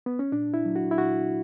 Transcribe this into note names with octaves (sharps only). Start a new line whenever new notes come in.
B3
C#4
A#2 D4
E4
F#3
F#4
E4
A#2 F#4